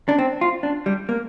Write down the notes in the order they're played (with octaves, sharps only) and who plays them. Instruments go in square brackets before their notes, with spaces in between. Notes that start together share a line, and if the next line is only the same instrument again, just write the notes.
[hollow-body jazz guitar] D4
C4
F4
D4
G3
A#3